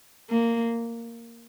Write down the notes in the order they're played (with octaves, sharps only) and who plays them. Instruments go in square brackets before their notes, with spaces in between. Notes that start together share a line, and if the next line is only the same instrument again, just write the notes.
[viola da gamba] A#3